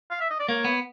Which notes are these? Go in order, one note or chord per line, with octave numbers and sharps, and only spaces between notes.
F5
E5
D#5
D5
A#3 C#5
B3